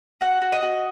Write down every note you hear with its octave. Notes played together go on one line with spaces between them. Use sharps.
F#4 F#5
F#4
D#5
F#4